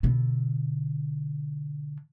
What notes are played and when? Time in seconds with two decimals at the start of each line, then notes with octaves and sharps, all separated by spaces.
0.03 B2 D3